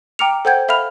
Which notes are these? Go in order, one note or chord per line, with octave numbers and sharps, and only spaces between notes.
G5 A#5 D6 F6 C#7 F7
A4 C5 F#5 G5 G6 G#6
A4 E5 F5 B5 F6 F7